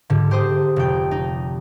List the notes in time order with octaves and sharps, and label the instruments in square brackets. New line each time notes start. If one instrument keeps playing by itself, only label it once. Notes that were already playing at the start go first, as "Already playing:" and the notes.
[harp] G#2 D3
G4 C5 D#6
F1 G5
D#4